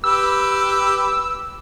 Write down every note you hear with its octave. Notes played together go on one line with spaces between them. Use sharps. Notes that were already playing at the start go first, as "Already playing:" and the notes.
G4 B4 D6 E6